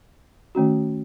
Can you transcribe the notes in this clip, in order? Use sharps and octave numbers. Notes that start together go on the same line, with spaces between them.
D#3 A3 C#4 F#4